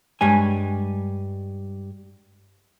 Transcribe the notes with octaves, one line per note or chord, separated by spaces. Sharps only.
G2 G3 G#3 C#5 G#5